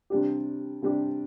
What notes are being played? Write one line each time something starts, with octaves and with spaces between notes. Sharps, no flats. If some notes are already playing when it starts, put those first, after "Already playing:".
C3 G3 D4 G4
C3 G3 D4 G4